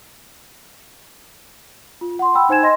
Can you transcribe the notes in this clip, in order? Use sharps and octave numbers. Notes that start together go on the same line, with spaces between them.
F4
F#5 C6
G5 B5 E6
D#4 C5 G#5 G#6 E7
D#5 C6 A#6